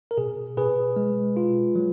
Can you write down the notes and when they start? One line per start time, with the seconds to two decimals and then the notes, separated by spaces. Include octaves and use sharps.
0.11 A#4
0.17 B2 G#4
0.57 B2 G#4 B4
0.96 G#3
1.37 F4
1.75 F#3